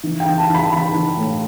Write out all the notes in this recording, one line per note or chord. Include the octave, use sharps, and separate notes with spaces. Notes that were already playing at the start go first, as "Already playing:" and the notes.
E3
G5
E3
A5
E3 B5
A5
E3 B5
E3
A2